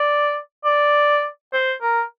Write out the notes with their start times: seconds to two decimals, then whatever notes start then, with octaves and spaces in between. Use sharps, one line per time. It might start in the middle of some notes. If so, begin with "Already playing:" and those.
Already playing: D5
0.64 D5
1.53 C5
1.82 A#4